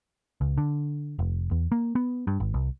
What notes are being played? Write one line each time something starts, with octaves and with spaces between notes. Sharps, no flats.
C#2
D3
F1
E2
A#3
B3
G2
G#1
C2